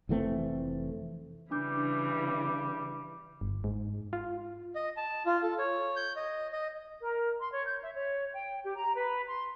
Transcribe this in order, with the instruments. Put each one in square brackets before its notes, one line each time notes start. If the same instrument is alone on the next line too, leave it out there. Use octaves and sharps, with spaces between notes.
[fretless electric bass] F1 E3 A3 C4
[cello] C#3 E3 [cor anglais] G3 [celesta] D4 D6 G6
[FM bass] G1
G#2
F4
[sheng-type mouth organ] D#5
A5
F4
A4
C#5
G6
D#5
D#5
[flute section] A#4
C6
C#5
G6
E5
C#5
G5
G4
A#5
B4
C6